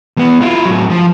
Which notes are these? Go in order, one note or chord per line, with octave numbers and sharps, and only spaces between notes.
E2 B3
E4 F4
A2 F#3
F3